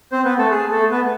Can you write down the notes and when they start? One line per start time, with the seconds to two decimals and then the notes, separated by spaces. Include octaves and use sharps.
0.12 C4 C5
0.25 B3 B4
0.38 A3 A4
0.51 G#4
0.71 A3 A4
0.91 B3 B4